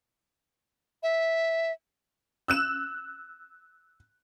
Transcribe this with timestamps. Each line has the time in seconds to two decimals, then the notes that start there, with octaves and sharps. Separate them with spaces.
1.03 E5
2.48 E6 F#6 E7